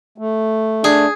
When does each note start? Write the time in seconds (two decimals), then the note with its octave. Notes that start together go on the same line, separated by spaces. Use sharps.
0.18 A3
0.84 D4 G#4